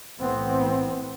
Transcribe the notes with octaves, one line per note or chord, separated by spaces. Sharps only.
B1 A2 E3 B3 C4